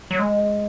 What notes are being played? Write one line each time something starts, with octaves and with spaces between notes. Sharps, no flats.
F#3
G#3